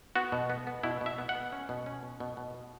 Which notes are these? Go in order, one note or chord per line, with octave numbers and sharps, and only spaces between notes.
B3 F#4
B2
B3
B3
B2 E4
B2 E5
B3
F#5
B3
C#4
B2
C#4
B2
B2
B2
B2